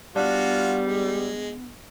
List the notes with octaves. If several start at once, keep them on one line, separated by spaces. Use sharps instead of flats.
G3 B3 D4 F4 F#4
G#3